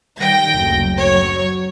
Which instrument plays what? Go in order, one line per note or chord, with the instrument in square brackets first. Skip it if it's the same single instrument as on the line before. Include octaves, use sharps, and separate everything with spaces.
[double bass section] D#3 G3 [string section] G5 A#6
[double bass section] F#1 D2 F#3
[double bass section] F#3 [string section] C#5